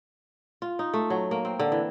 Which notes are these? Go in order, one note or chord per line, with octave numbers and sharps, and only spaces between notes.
F4
D#4
A3
F#3
A#3
C4
D3
E3